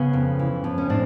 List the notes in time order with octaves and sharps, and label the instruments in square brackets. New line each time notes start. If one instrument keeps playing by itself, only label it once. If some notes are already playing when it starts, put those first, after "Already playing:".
Already playing: [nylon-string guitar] C#3 B3 C#4
F2
E3
F2
C#4
A2 C4 D4